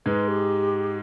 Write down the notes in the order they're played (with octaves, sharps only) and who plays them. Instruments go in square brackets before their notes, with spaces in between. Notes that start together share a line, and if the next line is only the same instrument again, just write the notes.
[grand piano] G#2 G#3 [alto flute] B4
[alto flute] G4